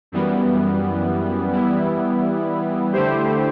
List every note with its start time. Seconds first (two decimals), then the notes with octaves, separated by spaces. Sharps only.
0.12 F#2 E3 G3 B3
1.53 E3 G3 B3 E4
2.93 D3 A3 E4 G4 C5